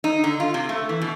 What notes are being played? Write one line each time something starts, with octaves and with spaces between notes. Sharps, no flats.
D#4
D3
F4
C3
A3
E3
B2